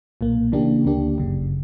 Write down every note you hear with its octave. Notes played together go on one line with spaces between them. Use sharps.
B1 A#2 A#3
C#3 E3 A#3 D4 G4
D2 D3 A#3 D4 G4
G1 F#2 C#3